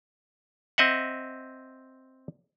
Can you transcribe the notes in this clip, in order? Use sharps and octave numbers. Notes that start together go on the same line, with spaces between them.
C4 D#5 E5 F#5